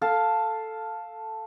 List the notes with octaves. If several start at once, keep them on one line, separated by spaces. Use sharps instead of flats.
A4 F5 A5